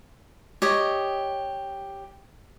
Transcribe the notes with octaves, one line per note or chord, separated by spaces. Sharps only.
G4 C#5 D#5 D#6